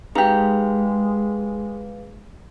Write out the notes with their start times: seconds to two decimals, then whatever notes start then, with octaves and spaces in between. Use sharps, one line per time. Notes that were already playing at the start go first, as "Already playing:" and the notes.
0.15 G#3 D#4 G4 G#4 B4 F5